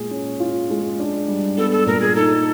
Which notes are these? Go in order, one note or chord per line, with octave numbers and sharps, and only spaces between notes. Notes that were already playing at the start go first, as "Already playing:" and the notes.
Already playing: A#2 G#3 G#4
C#4
F4
G#3
D4
G3
B3 A4
A4
A#2 A#4
G#4
D#4 A4